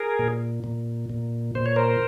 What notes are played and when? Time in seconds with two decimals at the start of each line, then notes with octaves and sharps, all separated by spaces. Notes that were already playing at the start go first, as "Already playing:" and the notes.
Already playing: G#4 A#4
0.19 A#2
0.64 A#2
1.10 A#2
1.55 A#2 C5
1.66 C#5
1.76 A#4 C5